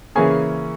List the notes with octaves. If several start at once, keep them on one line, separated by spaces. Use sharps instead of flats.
C#3 E3 A#3 C#4 G#4 G#5